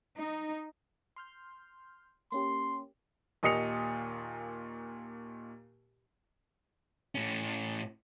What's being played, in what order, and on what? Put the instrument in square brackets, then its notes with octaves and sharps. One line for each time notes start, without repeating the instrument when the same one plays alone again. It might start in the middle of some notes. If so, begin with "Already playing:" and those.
[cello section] D#4
[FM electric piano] C6 F6 G6
[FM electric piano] A#3 C#4 G4 [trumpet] C6
[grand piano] D#2 A#2 D#5 D#6 C#7 F7
[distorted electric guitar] A2 C#4